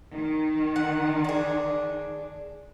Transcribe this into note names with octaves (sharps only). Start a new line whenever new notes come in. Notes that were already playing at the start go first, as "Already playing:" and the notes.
D#3
F#5
D4 G#4